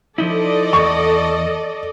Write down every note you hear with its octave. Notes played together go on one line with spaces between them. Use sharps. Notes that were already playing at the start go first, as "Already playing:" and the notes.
F3 D#4 E4 A4 D5 D#5
E2 C#6